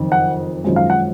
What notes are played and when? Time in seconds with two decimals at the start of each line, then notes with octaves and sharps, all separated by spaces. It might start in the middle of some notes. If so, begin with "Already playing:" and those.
Already playing: F#1 F2 D#3
0.12 F#5
0.64 G#1 F#2 F3 G#3
0.76 F5
0.90 F#5